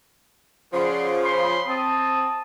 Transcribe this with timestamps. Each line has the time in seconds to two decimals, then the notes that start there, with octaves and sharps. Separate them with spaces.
0.73 C#3 F3 D5 F#5 C6
1.23 B5 C6
1.67 C4 A5 D#6